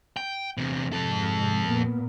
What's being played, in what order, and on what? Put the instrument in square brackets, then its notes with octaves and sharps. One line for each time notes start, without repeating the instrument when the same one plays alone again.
[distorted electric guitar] G5
E2 C3
[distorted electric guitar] F2 A4 [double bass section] G#2 C3 G#3
[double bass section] A#2 A#3 B3